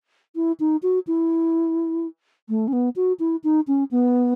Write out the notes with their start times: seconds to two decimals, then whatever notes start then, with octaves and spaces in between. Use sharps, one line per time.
0.35 E4
0.60 D#4
0.82 F#4
1.07 E4
2.49 A3
2.68 C#4
2.73 B3
2.96 F#4
3.19 E4
3.44 D#4
3.67 C#4
3.91 B3